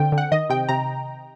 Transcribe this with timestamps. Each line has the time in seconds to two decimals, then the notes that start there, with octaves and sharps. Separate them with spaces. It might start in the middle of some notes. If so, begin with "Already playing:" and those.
Already playing: D3 C4 G5
0.12 D3
0.18 F#5
0.32 D#3 D#5
0.50 C3 G5
0.69 C3 A#5